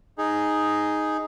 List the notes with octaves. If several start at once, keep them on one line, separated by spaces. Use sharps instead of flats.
D#4 G#4